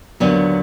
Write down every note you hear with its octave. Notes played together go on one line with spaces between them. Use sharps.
D#2 D3 F#3 B3